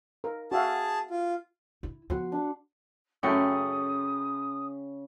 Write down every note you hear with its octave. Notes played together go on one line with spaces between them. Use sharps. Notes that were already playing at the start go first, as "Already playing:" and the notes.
A#4
F#4 G#4 E5 F5 A5
F4
E4
F3 B3 F#4 C6
D4
F#2 C#3 A3 G5 C#6 D#6